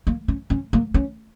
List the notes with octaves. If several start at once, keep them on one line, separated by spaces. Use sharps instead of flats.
A#3
C#4
C#4
A#3
C#4